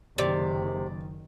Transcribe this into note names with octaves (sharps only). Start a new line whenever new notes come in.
F#1 C3 D#3 D5